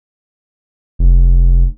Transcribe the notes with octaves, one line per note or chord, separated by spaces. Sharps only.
F1